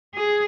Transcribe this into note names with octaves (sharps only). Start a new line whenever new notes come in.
G#4